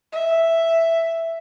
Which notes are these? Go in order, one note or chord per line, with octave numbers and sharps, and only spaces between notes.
E5